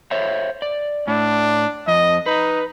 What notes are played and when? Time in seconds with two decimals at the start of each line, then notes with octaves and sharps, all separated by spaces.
0.11 C5 C#5 E5
0.62 D5
1.08 A2 D4
1.88 F2 D#5
2.26 D#4 B4